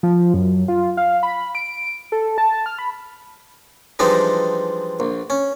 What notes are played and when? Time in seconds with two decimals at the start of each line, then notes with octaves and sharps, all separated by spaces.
0.03 F3
0.34 F#2
0.68 F4
0.97 F5
1.23 B5
1.55 D7
2.12 A4
2.38 A5
2.66 F6
2.79 B5
3.99 E3 F3 G3 G#3 D4 D#4
5.00 A#1
5.30 C#4